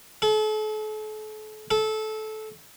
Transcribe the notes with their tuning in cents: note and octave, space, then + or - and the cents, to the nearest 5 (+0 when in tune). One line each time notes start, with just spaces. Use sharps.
A4 -40
A4 -20